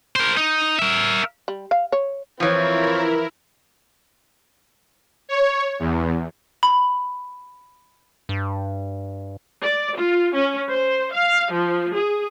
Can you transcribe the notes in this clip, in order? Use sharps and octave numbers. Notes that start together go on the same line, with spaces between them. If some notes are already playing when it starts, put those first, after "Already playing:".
A#4 C5
D#4
A#4 E5
G3
F5
C#5
E3 F3 C4 E4 F4 A#4 C#5 C#6
C#5
E2
B5
G2
D5
F4
C#4
C5
F5
F3
G#4